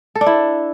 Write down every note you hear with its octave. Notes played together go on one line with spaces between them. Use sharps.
A4
D4
E4